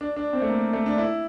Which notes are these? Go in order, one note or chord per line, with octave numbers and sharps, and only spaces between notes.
D4
D4
C4
A3
A#3
A3
D4
E4